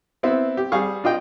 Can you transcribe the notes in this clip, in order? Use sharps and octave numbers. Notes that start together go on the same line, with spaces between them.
B3 C4 E4
G4
G3 G#4 F5 C#6
D4 F4 D#5 G5